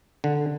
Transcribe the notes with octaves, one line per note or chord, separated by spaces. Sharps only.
D3